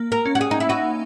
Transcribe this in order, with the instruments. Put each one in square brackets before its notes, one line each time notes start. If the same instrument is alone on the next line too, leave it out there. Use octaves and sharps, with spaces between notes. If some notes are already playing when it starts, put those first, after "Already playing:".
Already playing: [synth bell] A#3
[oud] A#4
[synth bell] C#4
[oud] F#4
G#4
D#4
E4
[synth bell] D#4 [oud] F#4